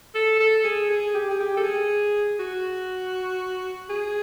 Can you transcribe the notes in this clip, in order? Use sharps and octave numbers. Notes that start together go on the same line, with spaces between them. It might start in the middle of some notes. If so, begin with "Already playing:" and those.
A4
A4
G#4
G#4
G4
G#4
G4
A4
G#4
F#4
G#4